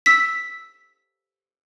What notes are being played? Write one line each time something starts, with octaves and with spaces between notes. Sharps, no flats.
E6 B6